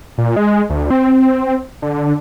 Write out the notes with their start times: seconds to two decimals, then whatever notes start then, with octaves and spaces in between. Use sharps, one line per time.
0.18 A#2
0.36 G#3
0.70 D2
0.91 C4
1.82 D3